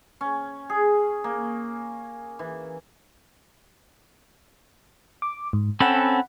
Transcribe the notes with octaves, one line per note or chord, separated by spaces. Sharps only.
C#4
G#4
A#3
E3
D6
G#2
C4 C#4 A4 F#5 B5